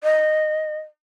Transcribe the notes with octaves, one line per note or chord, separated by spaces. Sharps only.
D#5